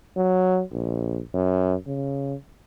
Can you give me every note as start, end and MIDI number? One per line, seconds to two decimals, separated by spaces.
0.17 0.61 54
0.71 1.21 34
1.34 1.75 42
1.87 2.34 49